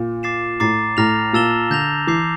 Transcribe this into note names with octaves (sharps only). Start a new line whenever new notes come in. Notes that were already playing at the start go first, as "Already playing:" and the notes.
Already playing: A#2
D6 A6 C7 E7
A2 A#5 D6 A6 C7
A2 A#5 F6 A#6 F7
A#2 A5 E6 A6 E7 G7
D3 G6 A#6 F7
E3 D6 G6 C7